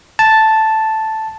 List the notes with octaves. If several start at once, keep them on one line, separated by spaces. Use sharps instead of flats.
A5